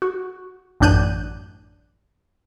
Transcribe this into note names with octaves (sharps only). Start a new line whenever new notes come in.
F#4
A1 F#2 D4 F#6 G6 D#7